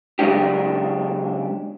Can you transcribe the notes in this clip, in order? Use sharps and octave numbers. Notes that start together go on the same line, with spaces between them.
C#3 F#3 G#3 A#3 D4 G4